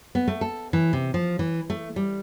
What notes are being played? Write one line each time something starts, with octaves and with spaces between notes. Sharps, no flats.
B3
A3
A4
E3
C3
F3
E3
A3
G3